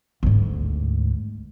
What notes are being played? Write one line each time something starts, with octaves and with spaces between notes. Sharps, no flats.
D2 G#2